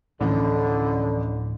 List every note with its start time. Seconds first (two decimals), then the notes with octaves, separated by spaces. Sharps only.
0.21 A1 D2 A2 D3 F3